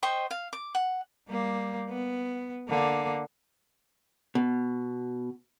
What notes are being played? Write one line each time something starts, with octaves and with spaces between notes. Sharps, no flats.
C5 D#5 G5 C#6
F5
D6
F#5
G3 A#3
B3
D3 A#3
B2